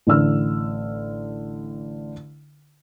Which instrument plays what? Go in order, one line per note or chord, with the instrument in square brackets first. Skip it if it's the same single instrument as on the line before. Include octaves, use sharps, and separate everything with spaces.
[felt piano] A1 D3 E6 F6